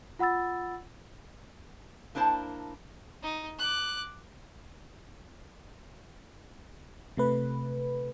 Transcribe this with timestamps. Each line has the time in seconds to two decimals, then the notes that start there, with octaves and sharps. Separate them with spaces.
0.19 F4 F#5 B5 E6 A6
2.15 A#3 D4 E4 C5 A5
3.23 D#4
3.59 D6 F#6
7.17 C3 A3 B4